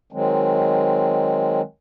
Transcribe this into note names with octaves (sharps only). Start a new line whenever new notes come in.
D#3 F#3 G#3 C4